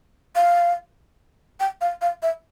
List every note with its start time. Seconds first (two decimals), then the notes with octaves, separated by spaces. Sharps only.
0.36 F5
1.60 G5
1.81 F5
2.02 F5
2.23 E5